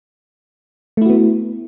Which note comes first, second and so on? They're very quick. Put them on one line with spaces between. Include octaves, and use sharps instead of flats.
A3 E4 F#4 B3